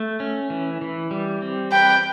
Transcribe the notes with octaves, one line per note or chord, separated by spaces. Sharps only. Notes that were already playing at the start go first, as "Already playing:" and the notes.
Already playing: A3
C#4
E3
E3
G3
C4
B4 G5